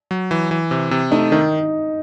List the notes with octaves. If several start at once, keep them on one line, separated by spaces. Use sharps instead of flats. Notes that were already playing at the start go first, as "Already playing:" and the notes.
F#3
E3
E3
C3
C3
A3 D#4
D#3 D#4